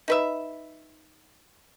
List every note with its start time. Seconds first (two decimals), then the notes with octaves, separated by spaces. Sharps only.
0.08 D#4 B4 E5